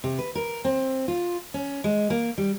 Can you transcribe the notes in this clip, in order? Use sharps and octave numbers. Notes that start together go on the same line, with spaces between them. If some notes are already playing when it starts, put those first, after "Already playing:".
C3
B4
A#4
C4
F4
C#4
G#3
A#3
G3